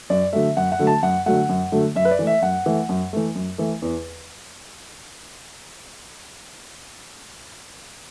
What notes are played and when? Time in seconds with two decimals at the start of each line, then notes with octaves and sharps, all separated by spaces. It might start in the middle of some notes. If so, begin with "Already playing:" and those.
0.10 F#2 D5
0.33 D3 F#3 A3 E5
0.57 F#2 F#5
0.72 F#5
0.79 D3 F#3 A3
0.87 A5
1.03 F#2 F#5
1.26 D3 F#3 A3 F#5
1.49 F#2
1.72 D3 F#3 A3
1.96 F#2 E5
2.05 B4
2.11 D5
2.19 E3 A3
2.27 E5
2.42 F#2 F#5
2.66 E3 A3
2.89 F#2
3.13 E3 A3
3.35 F#2
3.58 E3 A3
3.82 E2